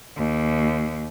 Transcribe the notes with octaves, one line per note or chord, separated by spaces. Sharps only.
D#2